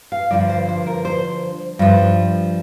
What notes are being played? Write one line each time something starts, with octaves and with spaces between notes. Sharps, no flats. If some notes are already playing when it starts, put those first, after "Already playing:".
F5
G2 D3 F3 D5
C5
C5
A#4
C5
G2 F3